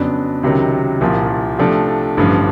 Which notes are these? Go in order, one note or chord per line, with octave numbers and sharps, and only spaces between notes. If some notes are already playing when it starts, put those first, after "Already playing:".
Already playing: F2 C#3 F#3 B3 D4
C#2 C3 D#3 F#3
C2 A#2 F3
C3 F3 A3 D4
A1 G2 D3 F3